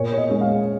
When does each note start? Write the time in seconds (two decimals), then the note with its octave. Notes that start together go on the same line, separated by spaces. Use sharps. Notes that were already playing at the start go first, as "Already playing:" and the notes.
Already playing: A#2 C#5
0.12 C#5
0.18 D#5
0.29 G#3 C#4
0.41 F5